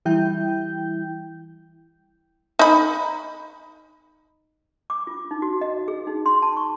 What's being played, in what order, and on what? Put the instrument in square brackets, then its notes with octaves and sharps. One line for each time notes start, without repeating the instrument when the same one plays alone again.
[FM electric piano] E3 G3 E4 G5 G6
[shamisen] D#4 B5
[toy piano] D6
F4
D#4
F#4
D#5
G#4
D#4
C6
A5
C#6